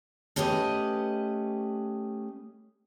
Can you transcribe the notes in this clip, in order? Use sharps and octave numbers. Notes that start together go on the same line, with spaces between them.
A3 C#4 G4 B4 D#5